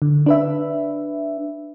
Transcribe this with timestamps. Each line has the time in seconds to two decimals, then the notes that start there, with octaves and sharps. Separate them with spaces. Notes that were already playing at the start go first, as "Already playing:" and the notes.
0.02 D3
0.26 D4 B4 E5